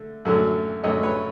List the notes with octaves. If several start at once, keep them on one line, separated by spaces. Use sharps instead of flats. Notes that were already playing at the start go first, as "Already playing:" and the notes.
Already playing: D3 A3
F#2 D3 F#3 A3
F#2 D3 F#3 A3 C#5 D#5
B4 C#5